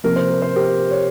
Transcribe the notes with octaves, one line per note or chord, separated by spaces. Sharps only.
C3 F3 A#3 A#4
C5
A#4
C5
G4 A#4
C#5